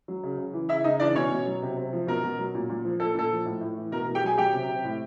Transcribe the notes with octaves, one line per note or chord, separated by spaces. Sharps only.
F#3
C#3
C#3
E3
C#3 E4 E5
C#3 D#4 D#5
E3 D4 D5
B2 C#4 C#5
B2
F#3
C3
C3
F3
B2 A#4
B2
F#3
A#2
A#2
F3
A#2 A4
A#2 A4
F3
A2
A2
E3
B2 A#4
B2
G4 G5
F#3 G#4 G#5
F#3 G4 G5
C3
C3
A2